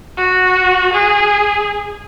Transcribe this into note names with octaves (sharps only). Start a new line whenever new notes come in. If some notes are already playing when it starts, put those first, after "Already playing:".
F#4
G#4